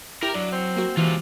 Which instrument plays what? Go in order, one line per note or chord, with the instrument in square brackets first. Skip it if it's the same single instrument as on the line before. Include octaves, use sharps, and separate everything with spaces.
[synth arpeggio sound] E4 [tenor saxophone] G4 [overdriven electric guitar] A#4 A#5
[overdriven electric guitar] F#3 [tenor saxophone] D4
[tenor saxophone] C4
[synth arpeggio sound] A#3 F#4
[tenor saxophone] C3 [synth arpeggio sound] E3 [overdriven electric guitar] G#3 F4